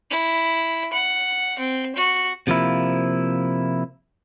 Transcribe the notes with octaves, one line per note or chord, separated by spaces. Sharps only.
E4
F#5
C4
F#4
C3 F3 A#3 E4